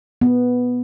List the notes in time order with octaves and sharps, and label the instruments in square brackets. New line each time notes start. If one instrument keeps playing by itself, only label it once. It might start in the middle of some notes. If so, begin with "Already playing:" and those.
[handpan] B3